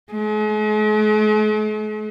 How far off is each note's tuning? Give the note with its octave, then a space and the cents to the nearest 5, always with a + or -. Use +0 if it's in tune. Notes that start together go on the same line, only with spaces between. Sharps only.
G#3 +45